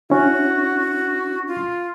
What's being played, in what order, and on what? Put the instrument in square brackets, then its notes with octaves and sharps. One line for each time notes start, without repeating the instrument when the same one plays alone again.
[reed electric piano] C#4 D4 E4 [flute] F#4
[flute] F4